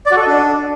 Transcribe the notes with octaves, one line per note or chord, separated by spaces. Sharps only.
D5
F#4
A4
D#5
D4